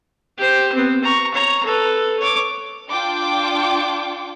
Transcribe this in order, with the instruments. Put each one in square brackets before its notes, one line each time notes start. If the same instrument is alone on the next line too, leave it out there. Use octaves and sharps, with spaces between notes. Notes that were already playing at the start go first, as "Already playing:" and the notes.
[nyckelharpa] G4 C5
B3 C4
A#5 C#6
C#5 A#5
A4 B4
C#5 D6
[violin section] D4 F4 G5 D6